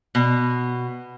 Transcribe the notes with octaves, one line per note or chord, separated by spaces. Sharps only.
B2